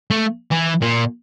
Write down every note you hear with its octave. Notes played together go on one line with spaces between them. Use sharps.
A3
E3
A#2